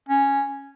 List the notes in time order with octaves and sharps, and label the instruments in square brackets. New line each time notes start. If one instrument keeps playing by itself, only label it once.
[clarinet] C#4